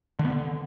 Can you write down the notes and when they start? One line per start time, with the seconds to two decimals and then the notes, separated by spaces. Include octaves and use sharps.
0.19 D3
0.25 B3
0.30 D3